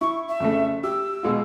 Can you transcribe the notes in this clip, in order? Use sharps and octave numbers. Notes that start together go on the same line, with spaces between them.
E4 C#6
E5
F2 C#3 A3
G4 E6
B2 G#3 F4